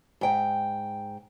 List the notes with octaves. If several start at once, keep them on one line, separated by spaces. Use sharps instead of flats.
G#2 G5